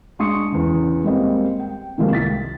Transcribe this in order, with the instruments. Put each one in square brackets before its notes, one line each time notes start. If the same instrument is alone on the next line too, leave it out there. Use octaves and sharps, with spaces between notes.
[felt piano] G#3 D4 C6 C#6 D#6 C#7
E2 C#3
G3 G#3 A#3 C4 D#5
G5
C3 D#3 F3 G#3 A#3 C4
C2 A6 B6